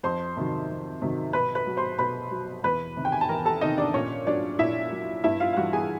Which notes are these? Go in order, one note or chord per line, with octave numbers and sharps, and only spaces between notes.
F2 C5 C6
C3 D#3 F#3
F2
C3 D#3 F#3
B2 B4 B5
B4 B5
F#3
C5 C6
B2 B4 B5
F#3
E2 B4 B5
C3 D#3
G5
G#5
A5
E2 A#4 A#5
A4 A5
C3 D#3 D#4 D#5
D4 D5
A#2 C#4 C#5
F#3 D4 D5
A#2 E4 E5
F#3
G2 E4 E5
F4 F5
F5
E3 G3 F#4 F#5
G#4 G#5